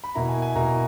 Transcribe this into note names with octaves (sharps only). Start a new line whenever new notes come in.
B5
B2 A#3 E4 A#5
G#5
G#5
B2 A#3 E4 A#5